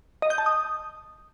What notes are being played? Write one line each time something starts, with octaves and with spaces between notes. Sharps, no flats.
D#5
G6
A5
D#6